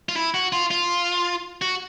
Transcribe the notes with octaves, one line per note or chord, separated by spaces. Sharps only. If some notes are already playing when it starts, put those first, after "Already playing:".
F4
E4
F#4
F4
F4
F#4